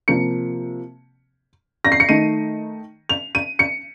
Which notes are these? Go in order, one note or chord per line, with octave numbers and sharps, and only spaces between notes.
C3 F3 A#3 C#7
A#6
C7
C#7
D#3 A3 D#4 D#7
F7
D#7
C#7